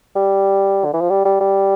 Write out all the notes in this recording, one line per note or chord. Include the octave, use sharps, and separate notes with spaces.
G3
D3
E3
F3
G3
G3
G3